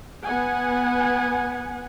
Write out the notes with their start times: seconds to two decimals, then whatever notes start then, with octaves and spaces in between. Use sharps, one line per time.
0.25 B3 F#5 G#5